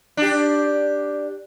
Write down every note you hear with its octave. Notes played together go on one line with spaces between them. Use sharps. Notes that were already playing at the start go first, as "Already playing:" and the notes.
D4 G4